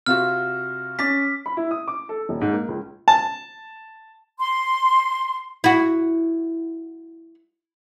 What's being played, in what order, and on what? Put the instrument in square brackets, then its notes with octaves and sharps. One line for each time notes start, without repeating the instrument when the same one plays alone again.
[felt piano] C3 F4 F#4 [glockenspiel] F6
[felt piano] C#4 D6 A6 [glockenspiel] B6
[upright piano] B5
E4
D#6
D6
A4
D#1
G#2
A#3
C#2
[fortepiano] A5
[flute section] C6
[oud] E4 F#4